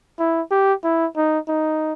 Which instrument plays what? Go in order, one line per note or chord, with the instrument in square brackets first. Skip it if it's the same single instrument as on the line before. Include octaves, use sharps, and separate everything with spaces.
[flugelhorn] E4
G4
E4
D#4
D#4